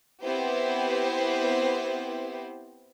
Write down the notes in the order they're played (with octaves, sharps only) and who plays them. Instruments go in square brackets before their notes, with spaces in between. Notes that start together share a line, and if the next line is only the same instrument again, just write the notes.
[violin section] B3 C4 E4 G4 C5